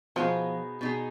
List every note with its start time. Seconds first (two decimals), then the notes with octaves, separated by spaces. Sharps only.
0.16 B2 F3 B3 D#4 G#4
0.81 B2 B3 D#4 G#4